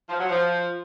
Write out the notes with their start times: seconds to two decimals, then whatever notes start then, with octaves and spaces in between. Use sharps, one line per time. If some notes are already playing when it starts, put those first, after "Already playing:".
0.09 F3
0.19 F#3
0.29 F3